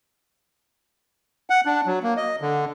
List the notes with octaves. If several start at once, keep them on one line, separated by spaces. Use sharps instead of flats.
F#5
D4
F#3
A#3
D#5
D3